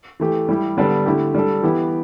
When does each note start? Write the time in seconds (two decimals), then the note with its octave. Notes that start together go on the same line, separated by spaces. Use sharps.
0.20 E3 A3 G4
0.49 G3 E4 G4
0.77 D3 G3 B3 D4 A4
1.06 D3 A3 E4 G4
1.35 G3 D4 A4
1.62 E3 B3 E4 G4